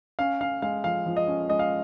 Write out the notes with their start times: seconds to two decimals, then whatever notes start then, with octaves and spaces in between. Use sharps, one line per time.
0.19 C#4 F5
0.41 C#4 F5
0.62 G#3 F5
0.84 F3 F5
1.06 F3
1.16 D#5
1.27 C#4
1.49 G#3 D#5
1.59 F5